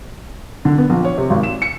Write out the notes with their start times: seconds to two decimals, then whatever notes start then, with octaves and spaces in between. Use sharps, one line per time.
0.65 D3
0.78 B3
0.90 A#1
1.05 C#5
1.18 C3
1.30 G#1
1.43 E7
1.62 C#7